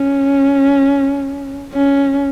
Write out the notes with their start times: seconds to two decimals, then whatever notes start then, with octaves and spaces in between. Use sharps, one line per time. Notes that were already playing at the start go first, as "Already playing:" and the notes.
Already playing: C#4
1.73 C#4